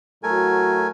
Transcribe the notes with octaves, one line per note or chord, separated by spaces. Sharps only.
A2 F#3 A3 F#4 A#4 G#5